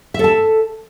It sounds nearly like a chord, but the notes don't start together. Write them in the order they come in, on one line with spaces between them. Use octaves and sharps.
E5 A4 A5